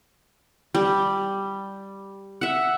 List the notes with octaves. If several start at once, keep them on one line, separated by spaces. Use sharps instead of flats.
G3
E5 F#5